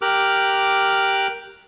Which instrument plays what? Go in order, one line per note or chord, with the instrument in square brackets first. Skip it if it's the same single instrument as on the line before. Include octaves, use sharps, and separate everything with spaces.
[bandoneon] G4 A#4 D6 F6 F#6